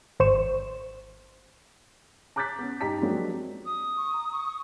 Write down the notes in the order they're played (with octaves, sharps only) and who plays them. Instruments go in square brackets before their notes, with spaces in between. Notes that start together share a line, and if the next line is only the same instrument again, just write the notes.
[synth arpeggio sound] G#1 C5 C#6 E7
[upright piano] A#5 D6 F#6 G6 A6 B6
B3 C#4
G2 D#4 G4 A#5 B6
F3 F#3 G#3 A#3 C4 D4
[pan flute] D#6
[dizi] C#6
A#5
C#6